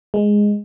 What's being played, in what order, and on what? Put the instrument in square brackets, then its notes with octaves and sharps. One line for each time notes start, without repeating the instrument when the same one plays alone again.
[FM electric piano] G#3